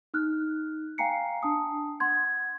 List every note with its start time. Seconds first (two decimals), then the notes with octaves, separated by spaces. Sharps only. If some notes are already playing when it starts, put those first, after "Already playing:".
0.14 D#4 F6 F#6
0.98 F5 G5 G#5 A#5 C7 C#7
1.43 D4 A5 D#6
2.00 F#5 C6 G#6